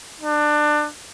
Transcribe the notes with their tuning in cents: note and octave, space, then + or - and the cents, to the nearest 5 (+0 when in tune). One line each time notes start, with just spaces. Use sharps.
D4 +25